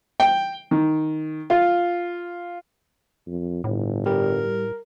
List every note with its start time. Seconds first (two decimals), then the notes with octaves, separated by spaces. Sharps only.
0.20 G5
0.71 D#3
1.50 F4
3.27 F2
3.64 G1 A2
4.06 G3 A#4